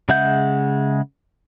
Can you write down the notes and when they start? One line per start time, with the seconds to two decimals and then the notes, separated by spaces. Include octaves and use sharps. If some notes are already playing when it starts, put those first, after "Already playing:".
0.09 C#3 G#3 E5 F#5 G6